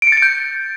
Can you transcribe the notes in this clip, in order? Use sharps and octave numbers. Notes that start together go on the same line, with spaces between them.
D7
C#7
A6
D7
G6